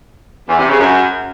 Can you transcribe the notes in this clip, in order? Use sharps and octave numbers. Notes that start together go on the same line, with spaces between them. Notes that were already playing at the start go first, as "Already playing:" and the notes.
E2
C3
C#3
F#2